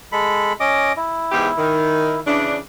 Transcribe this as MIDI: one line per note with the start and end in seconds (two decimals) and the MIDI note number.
0.12 0.53 56
0.12 0.53 69
0.12 0.53 83
0.60 0.92 61
0.60 0.92 75
0.60 0.92 86
0.97 2.20 64
1.32 1.48 40
1.32 1.48 44
1.32 1.48 67
1.58 2.19 51
2.27 2.57 49
2.27 2.57 52
2.27 2.57 62